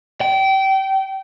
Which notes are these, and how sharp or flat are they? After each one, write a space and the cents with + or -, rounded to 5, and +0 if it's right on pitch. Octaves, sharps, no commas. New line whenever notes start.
G5 -25